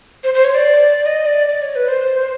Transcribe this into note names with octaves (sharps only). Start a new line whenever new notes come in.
C5
C5
C#5
D5
D#5
D5
D5
C#5
B4
C5